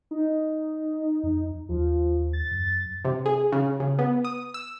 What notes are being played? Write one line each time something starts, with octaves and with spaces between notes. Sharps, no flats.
D#4
F2
D#2 F3
A6
F#2
C3
G#4
C#3
C#3
B3
D#6
E6